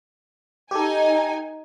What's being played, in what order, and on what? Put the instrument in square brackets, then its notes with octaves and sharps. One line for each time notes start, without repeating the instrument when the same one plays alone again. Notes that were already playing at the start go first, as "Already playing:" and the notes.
[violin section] D#4 G#5 [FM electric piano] G4 A4